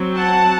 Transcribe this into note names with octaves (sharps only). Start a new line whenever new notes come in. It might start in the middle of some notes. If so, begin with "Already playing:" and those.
Already playing: F#3 C4
F#5 A5